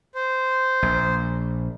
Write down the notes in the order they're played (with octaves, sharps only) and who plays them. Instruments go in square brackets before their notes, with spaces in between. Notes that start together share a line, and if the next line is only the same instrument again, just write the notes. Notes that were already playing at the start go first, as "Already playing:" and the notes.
[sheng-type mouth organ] C5
[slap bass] A#1